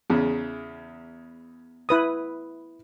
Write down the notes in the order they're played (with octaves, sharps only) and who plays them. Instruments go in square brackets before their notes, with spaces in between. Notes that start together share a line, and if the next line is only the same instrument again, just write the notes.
[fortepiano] E2 C#3
[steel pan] E4 B4 D#6